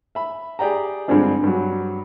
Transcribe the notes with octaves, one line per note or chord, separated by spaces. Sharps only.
E5 B5
G4 G#4 D5 G5 A#5
G2 D3 F3 G#3 C4 D4
G2 F#3